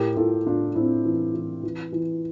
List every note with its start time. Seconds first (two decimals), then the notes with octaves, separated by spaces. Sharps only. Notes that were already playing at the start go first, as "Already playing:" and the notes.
Already playing: A2 G4 A#4
0.16 A2 F4 A4
0.46 A2 D4 F4
0.75 A2 C4 E4
1.05 E3
1.35 E3
1.63 E3
1.93 E3